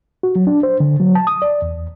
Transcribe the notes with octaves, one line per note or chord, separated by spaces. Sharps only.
F#4
F#3
D4
C5
D3
F#3
A5
D#6
D5
E2